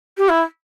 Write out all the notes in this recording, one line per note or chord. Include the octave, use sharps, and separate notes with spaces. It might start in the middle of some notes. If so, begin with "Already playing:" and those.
G4
E4